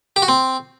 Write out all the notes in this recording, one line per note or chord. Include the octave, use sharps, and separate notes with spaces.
G4
F#4
C4